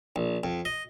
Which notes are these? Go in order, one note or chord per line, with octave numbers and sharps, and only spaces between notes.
A#1
F2
D#5